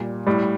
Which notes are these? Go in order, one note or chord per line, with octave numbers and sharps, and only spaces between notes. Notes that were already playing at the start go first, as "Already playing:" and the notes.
Already playing: A#2 G3
A2 G3